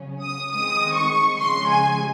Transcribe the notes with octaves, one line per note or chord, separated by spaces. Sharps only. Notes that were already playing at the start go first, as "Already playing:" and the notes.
Already playing: C#3 F#3 C#4
D#6
D#3 G#3 C4 D#6
C#6
C#3 F3 G#3 C6
G#5